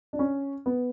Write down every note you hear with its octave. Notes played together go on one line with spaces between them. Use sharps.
D4
C#4
B3